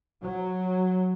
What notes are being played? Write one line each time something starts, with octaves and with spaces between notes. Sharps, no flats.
F#3